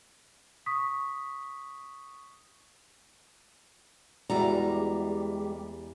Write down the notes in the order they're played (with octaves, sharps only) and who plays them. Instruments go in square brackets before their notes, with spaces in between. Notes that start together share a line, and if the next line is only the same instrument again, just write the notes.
[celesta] C#6 D#6 B6
[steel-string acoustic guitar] E2 G3 A#5 [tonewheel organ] G#3 G4 [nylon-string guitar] E4 F#4 D5